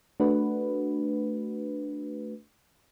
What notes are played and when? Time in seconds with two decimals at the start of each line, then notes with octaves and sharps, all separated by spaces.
0.20 A3 D4 F#4 B4